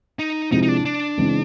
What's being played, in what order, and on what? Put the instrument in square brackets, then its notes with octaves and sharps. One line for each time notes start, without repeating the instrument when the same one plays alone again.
[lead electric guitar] D#4
[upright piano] C3 F3 G#3 C4 E4 [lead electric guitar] D#4
[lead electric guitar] D#4
D4
D4
[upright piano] C#3 E3 G#3 C4